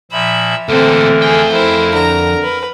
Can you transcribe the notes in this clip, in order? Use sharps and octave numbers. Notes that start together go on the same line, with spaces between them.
A#2 F3 E5 B5
D2 A#2 D3 E3 A3 C4 A4 A#4
F2 G#4 A4 G5
E4 A#4 C5
D3 A#5
B4